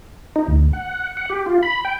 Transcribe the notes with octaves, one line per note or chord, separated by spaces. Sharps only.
D#4
D2
F#5
F#5
G4
F4
B5
G5